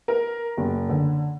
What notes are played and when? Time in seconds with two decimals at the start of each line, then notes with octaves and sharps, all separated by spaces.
0.08 A#4
0.57 F#1
0.89 D3